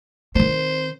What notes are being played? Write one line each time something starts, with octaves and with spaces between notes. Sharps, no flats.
D#3 C4 C5